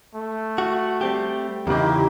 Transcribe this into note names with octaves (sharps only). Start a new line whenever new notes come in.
A3
F#4
G3 C4 G4
E2 C#3 A#3 D#4 E4 G4